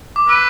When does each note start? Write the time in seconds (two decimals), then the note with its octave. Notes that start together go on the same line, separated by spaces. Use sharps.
0.16 D6
0.28 B4 E6